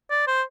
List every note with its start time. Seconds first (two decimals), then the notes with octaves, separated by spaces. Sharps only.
0.10 D5
0.27 C5